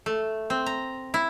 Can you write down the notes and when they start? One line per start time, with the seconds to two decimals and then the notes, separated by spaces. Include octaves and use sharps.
0.06 A3
0.50 C4
0.66 A#5
1.14 E4